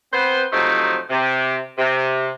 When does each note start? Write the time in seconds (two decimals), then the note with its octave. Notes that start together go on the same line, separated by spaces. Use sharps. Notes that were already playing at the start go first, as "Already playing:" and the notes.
0.13 B3 C4 B4 C5
0.53 C3 F3 F#3 A3 D#4 C5
1.10 C3
1.79 C3